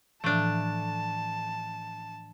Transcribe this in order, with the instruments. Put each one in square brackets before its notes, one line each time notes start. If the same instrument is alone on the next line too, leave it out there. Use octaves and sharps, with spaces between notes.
[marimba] A2 E3 F3 [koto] A3 D4 [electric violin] A5